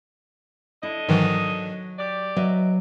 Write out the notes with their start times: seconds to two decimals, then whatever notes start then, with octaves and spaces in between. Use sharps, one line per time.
0.83 D3 E4 D#5
1.09 G#2 D#3 E3 F#3
1.99 G4 D5
2.37 F#3 B4 D#5 E5